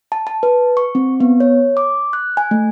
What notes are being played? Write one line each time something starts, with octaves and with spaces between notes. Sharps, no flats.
A5
A5
B4
C#6
C4
B3
C#5
D6
F#6
G#5
A3